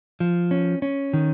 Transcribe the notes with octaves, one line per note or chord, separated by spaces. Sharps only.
F3
C#4
C#4
D#3